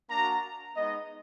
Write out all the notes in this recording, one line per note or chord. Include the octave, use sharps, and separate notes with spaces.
A#3 D4 F#4 A#5
G#3 B3 D#4 D#5